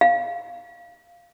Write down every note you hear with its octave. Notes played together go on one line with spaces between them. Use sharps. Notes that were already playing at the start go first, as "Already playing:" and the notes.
F5